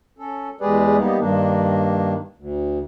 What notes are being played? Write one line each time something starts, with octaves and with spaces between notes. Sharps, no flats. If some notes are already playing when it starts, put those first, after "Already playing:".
C#4 A4
E2 G#3 G4 G#4 B4 D5
G3 A#3 B3 D#4 G4
G2 D#3 A#3 D4
D2